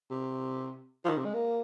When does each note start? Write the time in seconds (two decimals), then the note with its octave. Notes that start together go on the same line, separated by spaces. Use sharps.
0.10 C3
1.05 F3
1.09 D#3
1.17 C3
1.25 G#3
1.34 A#3